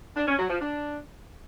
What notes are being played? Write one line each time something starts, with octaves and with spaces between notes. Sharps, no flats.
D4
C#4
F#3
F3
D4